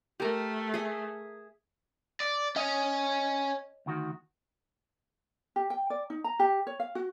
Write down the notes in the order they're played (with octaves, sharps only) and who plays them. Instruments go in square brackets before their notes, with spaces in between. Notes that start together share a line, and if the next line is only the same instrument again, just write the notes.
[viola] A3 [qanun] G4 A#4
[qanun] G#4 E5
[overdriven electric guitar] D5
[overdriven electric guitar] C#4 [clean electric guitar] C#5 D#5
[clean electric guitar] D2 D#3 F#4
[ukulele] G4
G5
D5
D#4
A#5
G4
C#5
F5
F#4